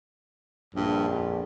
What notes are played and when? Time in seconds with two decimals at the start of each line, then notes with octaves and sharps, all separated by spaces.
0.75 A#1 G2
1.09 F2